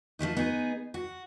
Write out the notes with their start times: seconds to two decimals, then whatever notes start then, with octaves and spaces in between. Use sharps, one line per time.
0.19 F3 G#3 A3 D#4
0.37 B3 D#4 G#4
0.94 F#4